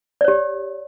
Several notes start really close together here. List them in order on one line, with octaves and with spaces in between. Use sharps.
D5 C#5 G4